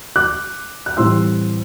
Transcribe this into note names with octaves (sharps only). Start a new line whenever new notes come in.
D6 F#6
F#6
A2 E3 G3 C4 C6 E6